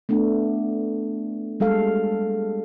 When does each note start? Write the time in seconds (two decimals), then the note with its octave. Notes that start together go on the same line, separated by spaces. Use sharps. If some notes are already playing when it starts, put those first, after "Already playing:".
0.09 A3 B3 D4
1.60 G3 G#3 A4 F5